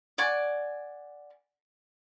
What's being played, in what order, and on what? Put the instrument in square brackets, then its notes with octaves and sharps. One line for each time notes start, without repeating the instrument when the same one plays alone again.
[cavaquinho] D5 F#5 G#5 C#6